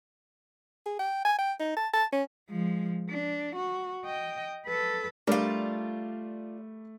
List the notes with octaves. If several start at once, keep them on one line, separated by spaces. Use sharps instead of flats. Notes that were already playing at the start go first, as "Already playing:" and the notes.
G#4
G5
G#5
G5
D#4
A5
A5
C#4
F3 G#3
D4
F#4
D#5 G5
A4 B4
G3 A3 D4 F4 A#4 D5